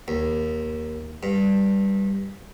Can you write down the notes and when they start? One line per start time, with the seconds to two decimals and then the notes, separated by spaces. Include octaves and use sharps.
0.08 D#2
1.23 G2